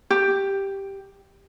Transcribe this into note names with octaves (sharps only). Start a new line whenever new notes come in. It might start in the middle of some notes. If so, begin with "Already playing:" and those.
G4